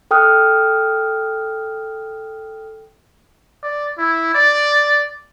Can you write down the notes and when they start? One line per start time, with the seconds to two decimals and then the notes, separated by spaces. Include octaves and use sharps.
0.11 A4 G5 D#6 F6 F#6
3.63 D5
3.98 E4
4.35 D5